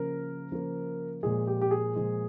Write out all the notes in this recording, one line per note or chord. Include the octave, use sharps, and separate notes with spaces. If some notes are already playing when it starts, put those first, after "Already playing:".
Already playing: C#3 F3 A#3 A#4
C#3 F3 A#3
A#2 F3 G#3 G#4
G4
G4
G#4
A#2 F3 G#3